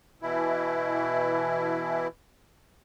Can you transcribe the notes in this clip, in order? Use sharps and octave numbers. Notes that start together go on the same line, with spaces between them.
B2 E3 E4